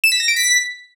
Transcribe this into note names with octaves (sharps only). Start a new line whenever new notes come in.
E7
B6
A#6
D7
B6